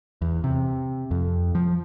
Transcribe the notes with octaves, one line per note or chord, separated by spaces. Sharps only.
E2
C3
F2
F3